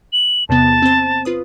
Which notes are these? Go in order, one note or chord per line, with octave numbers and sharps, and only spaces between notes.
F#7
E2 C3 B3 A5
C4 C5
F4 B4 D#6